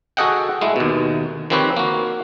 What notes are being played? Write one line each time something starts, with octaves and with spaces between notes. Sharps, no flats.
F#4 G#4 A4 D#5 F#5 G5
G#3 A3 E4
D#2 B2
D#3 F3 C4 G4 B4 C#5
A#3 F#4